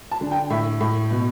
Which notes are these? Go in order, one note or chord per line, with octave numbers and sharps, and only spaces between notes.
A5
D3
G5
A2 E5
A2
B2